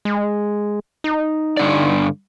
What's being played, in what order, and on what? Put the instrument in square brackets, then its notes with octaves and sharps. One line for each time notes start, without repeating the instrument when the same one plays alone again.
[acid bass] G#3
D#4
[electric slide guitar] G2 D3 D5